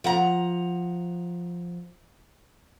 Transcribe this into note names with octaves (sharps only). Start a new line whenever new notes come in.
F3 F#5 A#5